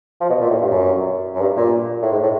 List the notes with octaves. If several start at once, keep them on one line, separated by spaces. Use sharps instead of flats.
F3
B2
A#2
A2
G2
F#2
F#2
G2
A#2
A2
G#2
A2